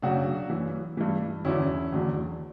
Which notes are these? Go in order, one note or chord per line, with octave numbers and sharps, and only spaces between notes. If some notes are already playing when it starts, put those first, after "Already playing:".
F#2 C#3 F#3 D4 F#4
F#2 E3
G2 E3
E2 D3 F#3 C#4 E4
E2 D3 F#3